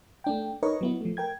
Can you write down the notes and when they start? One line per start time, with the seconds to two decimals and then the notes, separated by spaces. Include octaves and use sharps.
0.24 A3 D4 G5
0.63 D#4 A#4 B4 C#5 D#5 C#6
0.81 F#3 B3 E4
1.01 F3 A3
1.17 A#4 G5 G#6